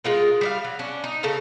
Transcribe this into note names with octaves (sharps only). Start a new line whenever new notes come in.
G#3 F4 A#4
G3 D5 F5
F#3
C#4 D4
D#4
C#3 A4 A#4 F5